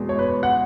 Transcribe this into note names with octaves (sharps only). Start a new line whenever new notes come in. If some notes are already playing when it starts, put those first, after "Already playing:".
Already playing: E2 B2 G#3
C#5
B4
F#5